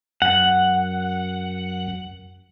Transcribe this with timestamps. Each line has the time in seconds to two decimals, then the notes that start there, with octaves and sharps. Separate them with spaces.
0.22 F#2 F#5